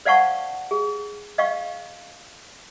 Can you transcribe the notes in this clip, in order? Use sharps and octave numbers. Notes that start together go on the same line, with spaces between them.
C5 D5 F5 F#5 A5 C#6
G#4
D#5 F5 G5 C#6